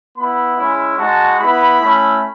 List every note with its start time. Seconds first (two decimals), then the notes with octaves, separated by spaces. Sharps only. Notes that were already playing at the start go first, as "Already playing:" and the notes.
0.16 B3 E4 B5
0.56 G#3 C#4 E4
0.98 G#3 D#4 F#4 A5
1.38 B3 E4 B5
1.78 A3 C#4 E4